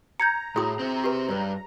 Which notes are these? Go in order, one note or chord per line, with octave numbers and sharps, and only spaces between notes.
A#5 G6 G#6 C#7
A2 E4 F#4 G#4 D#6
C3 C4
G4 B4
G2 B4 C#5